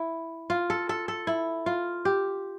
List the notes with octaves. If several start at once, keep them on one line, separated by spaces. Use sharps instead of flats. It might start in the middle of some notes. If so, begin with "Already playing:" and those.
Already playing: E4
F4
A4
A4
A4
E4
F4
G4